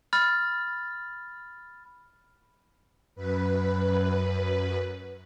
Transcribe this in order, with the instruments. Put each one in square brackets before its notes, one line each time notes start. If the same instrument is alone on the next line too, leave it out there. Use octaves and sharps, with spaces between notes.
[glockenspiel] B5 F6 A6
[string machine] F#2 B4